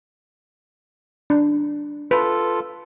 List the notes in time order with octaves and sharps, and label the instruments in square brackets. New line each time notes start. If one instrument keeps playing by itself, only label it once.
[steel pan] D4
[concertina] F4 A4 [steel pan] B4